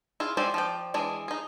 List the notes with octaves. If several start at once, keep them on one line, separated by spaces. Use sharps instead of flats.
E4 F4 G#4
G#3 G4 C5 D5 E5
F3 D5 G5
E3 G#3 D4 G#4
D#4 G#4